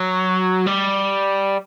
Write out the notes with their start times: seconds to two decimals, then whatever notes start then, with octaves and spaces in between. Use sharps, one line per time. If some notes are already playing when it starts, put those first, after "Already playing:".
Already playing: F#3
0.67 G3